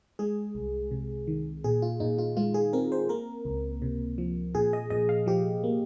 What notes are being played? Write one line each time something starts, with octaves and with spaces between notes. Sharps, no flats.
G#3 G#4
C2
C3
D#3
A#2 G#4
F4
A#2 D#4
F4
G#3 F4
G#4
C4 A#4
C5
A#3 A#4
C#2
C3
F3
A#2 G#4
D#5
A#2 D#5
F5
F3 G4
A#3